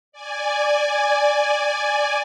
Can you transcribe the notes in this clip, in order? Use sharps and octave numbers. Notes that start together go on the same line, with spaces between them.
D5 G#5